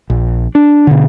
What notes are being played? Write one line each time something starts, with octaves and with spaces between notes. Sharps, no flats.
A#1
D4
B2 D3